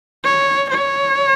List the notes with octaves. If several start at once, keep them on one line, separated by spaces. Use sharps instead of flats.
C#5
C#5